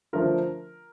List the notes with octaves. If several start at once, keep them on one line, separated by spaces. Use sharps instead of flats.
D3 F3 A3 D4 F4 A#4